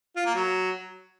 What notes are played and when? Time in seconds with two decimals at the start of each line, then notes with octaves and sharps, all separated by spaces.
0.16 F4
0.25 A#3
0.35 F#3